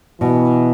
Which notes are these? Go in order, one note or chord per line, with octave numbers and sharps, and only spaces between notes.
B2 E3